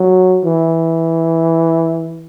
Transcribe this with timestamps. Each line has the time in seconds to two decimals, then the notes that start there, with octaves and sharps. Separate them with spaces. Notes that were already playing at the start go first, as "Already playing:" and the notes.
Already playing: F#3
0.44 E3